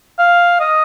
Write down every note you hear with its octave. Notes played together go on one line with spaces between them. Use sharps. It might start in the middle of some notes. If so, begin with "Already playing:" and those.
F5
D#5